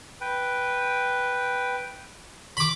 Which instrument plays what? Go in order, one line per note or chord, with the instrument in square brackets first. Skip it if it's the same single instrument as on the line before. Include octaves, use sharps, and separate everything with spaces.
[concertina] B4 G5
[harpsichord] B5 D6